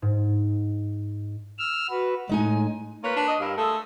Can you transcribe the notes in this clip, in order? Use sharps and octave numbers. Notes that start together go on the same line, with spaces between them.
G#2
E6 F6
F#4 B4
A2 G#3 D#4 G#5
A#3 F4 B4 C#5
D4
D#5
G2 E4 A#4 F5
G#3 A3 A4